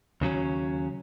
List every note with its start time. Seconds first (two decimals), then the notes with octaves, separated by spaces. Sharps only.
0.21 D#2 C#3 F#3 C#4